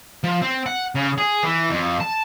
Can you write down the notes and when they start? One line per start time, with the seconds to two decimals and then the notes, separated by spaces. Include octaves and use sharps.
0.24 F3
0.42 C4
0.66 F#5
0.95 C#3
1.18 G#4
1.44 E3
1.70 F2
2.00 A5